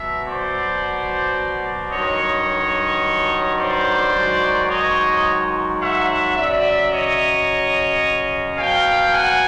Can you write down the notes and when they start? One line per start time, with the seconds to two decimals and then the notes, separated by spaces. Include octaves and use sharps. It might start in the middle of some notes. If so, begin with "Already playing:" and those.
Already playing: B2 F#3 E5
0.26 C5 D5
1.92 G2 D#3 F#3 C#5 D#5
3.58 C5 D5
4.13 G#2 D#3 F#3
4.69 C#5 D#5
5.79 E5 F#5
6.35 F#2 C#3 F#3 D5 E5
6.91 C#5 D#5
8.56 B2 F#3 F5 G5
9.12 F#5 G#5